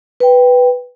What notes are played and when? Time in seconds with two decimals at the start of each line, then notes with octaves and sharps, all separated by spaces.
0.20 B4 G5